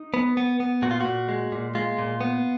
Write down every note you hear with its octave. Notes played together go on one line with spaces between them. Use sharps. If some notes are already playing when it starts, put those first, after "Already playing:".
Already playing: D#4
B3
B3
B3
A#2 F#4
F4
A#2 F#4
G#3
A#2
G#3 F4
A#2
B3